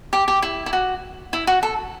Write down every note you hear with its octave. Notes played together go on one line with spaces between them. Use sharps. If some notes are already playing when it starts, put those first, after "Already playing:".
G4
G4
E4
E4
F#4
E4
F#4
A4